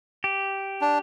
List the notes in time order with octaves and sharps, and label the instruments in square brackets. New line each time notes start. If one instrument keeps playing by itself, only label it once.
[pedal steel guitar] G4
[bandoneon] D4